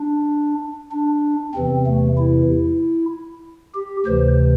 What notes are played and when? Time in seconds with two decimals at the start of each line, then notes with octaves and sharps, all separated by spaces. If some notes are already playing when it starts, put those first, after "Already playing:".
Already playing: D4
0.92 D4
1.54 E2 C3 E3 C4
1.86 A3
2.18 E4
3.75 G4
4.06 D2 C3 E3 C5